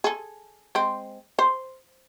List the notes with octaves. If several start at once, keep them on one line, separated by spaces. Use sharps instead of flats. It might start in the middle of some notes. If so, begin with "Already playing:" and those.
G#4 A4
G#3 C4
C5